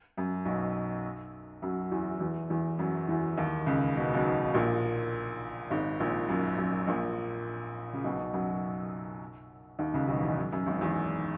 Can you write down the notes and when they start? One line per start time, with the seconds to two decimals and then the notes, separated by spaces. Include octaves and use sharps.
0.17 F#2
0.45 B1 B2
1.62 F#2 F#3
1.92 E2 E3
2.20 E2 E3
2.50 E2 E3
2.79 F#2 F#3
3.08 E2 E3
3.37 D#2 D#3
3.66 C#2 C#3
3.96 B2
4.05 C#3
4.14 B1 B2
4.54 A#1 A#2
5.71 G#1 G#2
6.00 A#1 A#2
6.29 F#2
6.58 F#2
6.87 A#1 A#2
7.93 C#3
8.04 B1 B2
8.33 F#2 F#3
9.79 D#2 D#3
9.94 C#2 C#3
10.08 B1 B2
10.23 E2
10.37 F#2
10.52 F#2
10.66 G#1 G#2
10.81 E2